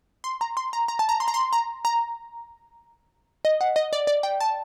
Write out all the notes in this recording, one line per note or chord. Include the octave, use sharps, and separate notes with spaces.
C6
A#5
C6
A#5
A#5
A5
A#5
C6
A#5
C6
A#5
A#5
D#5
F#5
D#5
D5
D5
G5
A5